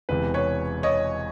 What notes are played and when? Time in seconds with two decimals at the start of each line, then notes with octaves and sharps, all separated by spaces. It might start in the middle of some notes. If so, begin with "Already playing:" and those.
0.09 E1 E2 C3 E3 B4
0.34 B4 C#5
0.83 C#5 D#5